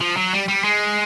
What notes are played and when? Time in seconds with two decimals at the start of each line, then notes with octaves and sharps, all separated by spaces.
0.01 F3
0.17 F#3
0.33 G3
0.48 G3
0.64 G#3